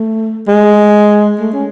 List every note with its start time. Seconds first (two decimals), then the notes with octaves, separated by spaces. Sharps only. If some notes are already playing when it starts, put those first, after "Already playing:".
Already playing: A3
0.47 G#3
1.40 A3
1.53 C#4